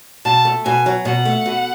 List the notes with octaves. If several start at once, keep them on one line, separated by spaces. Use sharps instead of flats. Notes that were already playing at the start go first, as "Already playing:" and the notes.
B2 A5
A3
B2 G#5
F#3
B2 F#5
A3
B2